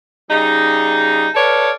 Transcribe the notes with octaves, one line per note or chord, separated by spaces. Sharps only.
C#3 G3 D#4
A4 B4 C#5 D5 F5